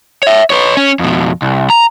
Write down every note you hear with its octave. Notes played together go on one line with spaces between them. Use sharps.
C#5 E5
B4 C#5
C#4
F2 B2
C2
A#5